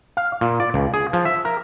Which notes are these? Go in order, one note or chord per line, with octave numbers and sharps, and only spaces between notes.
F5
A#2
D5
C#2
G#4
F3
E5
A#4